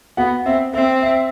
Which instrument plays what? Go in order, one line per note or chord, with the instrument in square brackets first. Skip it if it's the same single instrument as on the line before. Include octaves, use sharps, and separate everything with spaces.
[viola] B3 [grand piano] F#4 F#5
[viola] C4 [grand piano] E5
[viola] C4 [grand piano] E5
[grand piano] E5